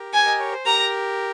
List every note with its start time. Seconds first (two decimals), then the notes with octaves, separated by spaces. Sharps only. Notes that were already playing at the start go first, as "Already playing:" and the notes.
Already playing: G4 A#4
0.13 G#5
0.26 D#5
0.39 C#5
0.52 C5
0.66 G4 A#4 A#5